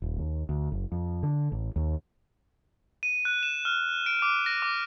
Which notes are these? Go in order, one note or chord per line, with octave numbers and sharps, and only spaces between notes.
D#1
D#2
D2
F#1
F2
D3
A1
D#2
D#7
F#6
E7
F6
D7
D6
A#6
D6